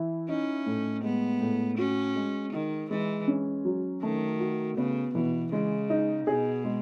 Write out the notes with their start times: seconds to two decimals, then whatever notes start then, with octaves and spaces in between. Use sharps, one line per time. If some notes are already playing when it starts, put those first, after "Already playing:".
Already playing: E3 E4
0.29 C#4 D#4
0.66 A2
1.03 G#3 B3
1.41 A2
1.78 C#4 F#4
2.16 G#3
2.53 D#3 D#4
2.90 E3 G#3
3.27 C#4
3.65 F#3
4.02 D#3 A3
4.40 F#4
4.77 C#3 B3
5.15 B2 E3
5.52 C#3 G#3
5.90 D#4
6.27 B2 G#4
6.64 G#3